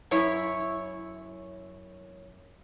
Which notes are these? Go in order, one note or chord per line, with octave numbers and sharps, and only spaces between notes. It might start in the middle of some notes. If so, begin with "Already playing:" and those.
F#2 E4 C#5